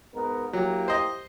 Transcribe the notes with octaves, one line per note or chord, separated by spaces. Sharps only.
G#2 B3 A#4
F#3 A#3 E4 G4
C5 D#5